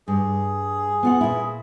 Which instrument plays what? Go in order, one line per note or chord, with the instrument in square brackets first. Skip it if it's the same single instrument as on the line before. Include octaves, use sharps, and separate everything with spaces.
[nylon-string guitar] G2 [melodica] G#4
[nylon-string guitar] B3 F4 F#5
A#2 E4